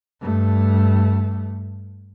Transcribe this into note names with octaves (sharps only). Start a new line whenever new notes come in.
G2 A3